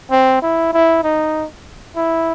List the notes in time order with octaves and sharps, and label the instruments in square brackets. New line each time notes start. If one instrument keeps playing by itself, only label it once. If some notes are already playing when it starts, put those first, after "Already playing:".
[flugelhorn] C4
E4
E4
D#4
E4